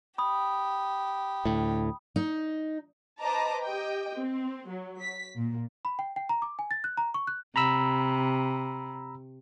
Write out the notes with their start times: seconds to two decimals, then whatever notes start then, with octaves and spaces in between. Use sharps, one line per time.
0.18 G4 B5 D#6
1.45 D2 A2
2.16 D#4
3.20 B4 C5 D#5 A5 A#5 D6
3.63 G4 D#5 G5
4.16 C4
4.68 F#3
5.01 B6
5.37 A#2
5.85 B5
5.99 G5
6.16 G5
6.29 A#5
6.42 D6
6.59 G#5
6.71 A6
6.84 F#6
6.98 A#5
7.14 C#6
7.27 F#6
7.56 C3 A#5 B5 E6